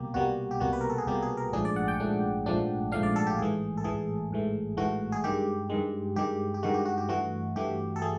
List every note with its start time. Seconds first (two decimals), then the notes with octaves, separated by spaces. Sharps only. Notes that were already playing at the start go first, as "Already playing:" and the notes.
Already playing: C2 B2 G3 A#3 G4
0.14 C2 B2 G3 A#3 F#4
0.51 G4
0.60 C2 B2 G3 A#3 F#4
0.73 B4
0.81 A#4
0.90 A4
0.98 G#4
1.07 C2 B2 G3 A#3 G4
1.22 G#4
1.37 A#4
1.53 A#1 G#2 F3 A3 D4 G#4
1.65 D5
1.76 F#5
1.88 G5
2.00 A#1 G#2 F3 A3 D4
2.46 A#1 G#2 F3 A3 D4
2.92 A#1 G#2 F3 A3 D4 F5
3.03 D5
3.16 A4
3.27 G4
3.38 A1 G#2 E3 A3 G#4
3.77 A4
3.84 A1 G#2 E3 A3 G#4
4.31 A1 G#2 E3 A3
4.77 A1 G#2 E3 A3 F#4
5.12 G#4
5.24 G2 D#3 G#3 G4
5.70 G2 D#3 G#3
6.16 G2 D#3 G#3 G4
6.54 G4
6.63 G2 D#3 G#3 F#4
6.74 G4
6.85 F#4
6.98 G4
7.09 G2 E3 A3 F#4
7.56 G2 E3 A3 G4
7.96 A4
8.02 A3 G#4